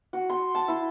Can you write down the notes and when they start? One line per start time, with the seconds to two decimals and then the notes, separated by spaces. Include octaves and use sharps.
0.13 F#4
0.29 C6
0.55 A5
0.68 E4